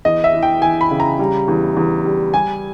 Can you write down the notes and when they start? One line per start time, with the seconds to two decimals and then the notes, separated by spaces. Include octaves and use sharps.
0.05 E2 D#5
0.24 E5
0.33 E3
0.43 G5
0.61 E3 G#5
0.81 B5
0.91 C#3
1.00 A#5
1.19 G3
1.48 E2
1.76 E2
2.05 G3
2.34 G3 G#5